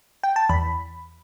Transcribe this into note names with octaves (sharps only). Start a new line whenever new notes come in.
G5
A5
E2 B5